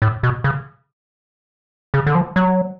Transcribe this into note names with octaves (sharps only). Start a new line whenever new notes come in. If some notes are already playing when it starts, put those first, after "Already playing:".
A2
B2
C#3
C#3
D3
F3
F#3